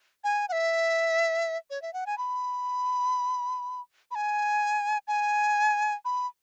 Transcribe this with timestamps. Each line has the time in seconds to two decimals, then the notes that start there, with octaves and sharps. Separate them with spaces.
0.24 G#5
0.49 F#5
0.52 E5
1.70 C#5
1.82 E5
1.93 F#5
2.06 G#5
2.18 B5
4.11 B5
4.15 G#5
5.07 G#5
6.05 B5